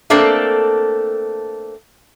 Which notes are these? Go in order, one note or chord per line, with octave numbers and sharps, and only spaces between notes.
A3 A#3 C4 D4 A4